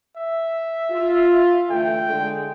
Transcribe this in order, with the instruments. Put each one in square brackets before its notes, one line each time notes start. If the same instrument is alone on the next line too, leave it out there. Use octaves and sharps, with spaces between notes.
[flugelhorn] E5
[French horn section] F4
[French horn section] D3 E3 A3 [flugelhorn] G5
[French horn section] D3 G#3